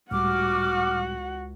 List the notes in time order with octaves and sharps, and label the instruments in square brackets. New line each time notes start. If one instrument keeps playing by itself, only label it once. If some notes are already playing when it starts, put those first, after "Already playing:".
[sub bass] C#2 [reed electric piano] A2 G3 [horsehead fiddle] F#4 F#5 [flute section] D6 F6